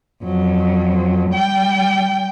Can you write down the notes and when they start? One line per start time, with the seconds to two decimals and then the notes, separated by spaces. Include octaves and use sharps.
0.24 F2 F#3
1.31 G3 G5